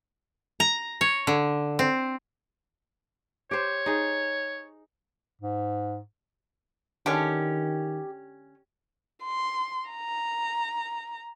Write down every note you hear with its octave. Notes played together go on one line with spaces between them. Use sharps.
A#5
C#5
D3
C4
G4 C5 C#5
D#4 G#4
G#2
D3 D#3 G#3 C#4 G4
C6
A#5